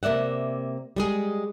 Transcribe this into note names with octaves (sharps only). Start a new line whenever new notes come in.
C3 A#3 D5 E5 F#5
G3 G#3 G#4